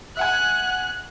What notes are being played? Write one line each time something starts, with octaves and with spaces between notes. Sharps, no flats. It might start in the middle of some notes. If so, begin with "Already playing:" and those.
E5 F#5 G#5 F#6